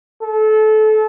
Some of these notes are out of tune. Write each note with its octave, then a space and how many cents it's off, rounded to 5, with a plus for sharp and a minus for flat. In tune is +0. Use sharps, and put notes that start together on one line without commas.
A4 -25